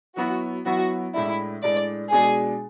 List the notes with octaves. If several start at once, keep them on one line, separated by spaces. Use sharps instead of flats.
F#3 B3 E4 F#4
F#3 B3 E4 F#4
A2 G#3 D4 E4
A2 G#3 D4 D5
B2 G#3 D4 G#4